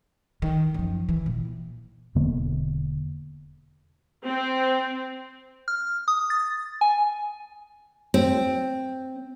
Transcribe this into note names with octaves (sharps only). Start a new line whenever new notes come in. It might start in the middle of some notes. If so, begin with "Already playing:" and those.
D#3
F#2 F3
E3
A#2
E1 D3 A#3 B3
C4
F6
D#6
A6
G#5
C4